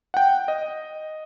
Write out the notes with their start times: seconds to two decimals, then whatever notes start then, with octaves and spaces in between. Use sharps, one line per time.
0.14 F#5 G5
0.48 D#5